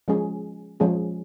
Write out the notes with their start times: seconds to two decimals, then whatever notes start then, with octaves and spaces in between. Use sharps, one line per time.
0.08 F3 G#3 C#4 G#4
0.80 F3 G#3 C#4 G#4